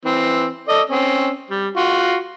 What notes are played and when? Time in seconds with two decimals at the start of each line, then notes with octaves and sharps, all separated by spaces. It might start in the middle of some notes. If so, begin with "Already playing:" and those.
0.05 E3 C4
0.69 A4 D5 D#5
0.89 C4 C#4
1.50 G3
1.77 F4 F#4 C6